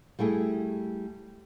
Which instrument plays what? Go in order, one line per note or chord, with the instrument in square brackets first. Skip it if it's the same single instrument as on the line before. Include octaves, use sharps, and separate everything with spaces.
[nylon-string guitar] G3 A3 E4 G#4